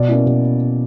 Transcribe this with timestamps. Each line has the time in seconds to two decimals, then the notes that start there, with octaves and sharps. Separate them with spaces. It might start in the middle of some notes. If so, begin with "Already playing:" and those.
Already playing: B2 D5
0.08 A#3 C#4 E4
0.26 B2